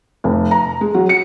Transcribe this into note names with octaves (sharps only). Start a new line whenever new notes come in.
F1
A#5
G#3
F#3
C#7